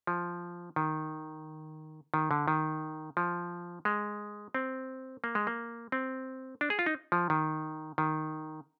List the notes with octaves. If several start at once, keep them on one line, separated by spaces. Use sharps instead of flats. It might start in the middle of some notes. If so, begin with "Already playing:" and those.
F3
D#3
D#3
D3
D#3
F3
G#3
C4
A#3
G#3
A#3
C4
D4
G#4
F4
D#4
F3
D#3
D#3